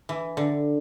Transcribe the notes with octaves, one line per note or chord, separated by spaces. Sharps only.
E3
D3